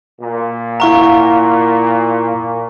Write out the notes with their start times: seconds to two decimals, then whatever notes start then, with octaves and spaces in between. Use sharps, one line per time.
0.20 A#2
0.80 E4 F5 F#5 A#5 C#6